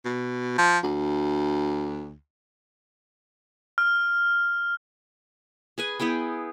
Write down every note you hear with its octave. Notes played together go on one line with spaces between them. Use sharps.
B2
F3
D2
F6
G#4 B4 G#5
B3 E4 G#4 G5